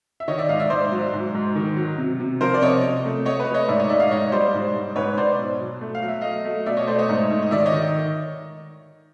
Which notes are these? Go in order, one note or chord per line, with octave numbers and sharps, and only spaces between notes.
E5
D#3 C#5 D#5
D5 E5
G#2 D#5 F5
D5 E5
G#2 C5 D5
F#3
G#2
G#2
D#3
F#3
C3
C3
F3 A#4 C5
D5
C3 C#5 D#5
C3
A3
A3 C#5 D#5
B4 C#5
A3
C#5 D#5
G#2 D5 E5
C#5 D#5
G#2 D5 E5
D#5 F5
G#2 C#5 D#5
C#5
G3 C5 D5
G#2
G#2
G#2 B4 C#5
G#2 C5 D5
B2
F#3
A3
F5
F#3
E5
A3 D#5 F5
A3
B2 D5 E5
C#5 D#5
A3 C5 D5
C#5 D#5
G#2
G#2
D#5
D#3 D5 E5
C#5 D#5
D#3